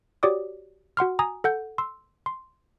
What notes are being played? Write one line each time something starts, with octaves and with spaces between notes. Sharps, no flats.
F#4 G4 C#5 D5 D6 D#6
F#4 F#5 C6 F6
G#5 A#5 D#6
A4 F#5 G6
C6 E6
C6